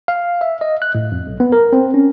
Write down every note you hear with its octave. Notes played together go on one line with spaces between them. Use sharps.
F5
E5
D#5
F#6
A2
F2
B1
B3
A#4
C4
C#4